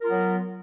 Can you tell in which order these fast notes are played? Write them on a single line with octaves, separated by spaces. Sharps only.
A#4 F4 F#3 B3